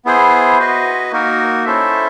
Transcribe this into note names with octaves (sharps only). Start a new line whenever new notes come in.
B3 E4 G#4 C5
F#4 B4 D#5
A#3 D#4 F#4 A#4
C#4 E4 A4 C5 E5